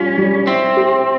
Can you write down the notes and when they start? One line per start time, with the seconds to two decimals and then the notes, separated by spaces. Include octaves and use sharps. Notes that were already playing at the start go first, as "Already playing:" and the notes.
Already playing: G3 C#4 F4
0.18 G3
0.47 C4 E4
0.77 G4